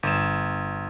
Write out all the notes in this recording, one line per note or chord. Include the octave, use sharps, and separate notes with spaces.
G1 E7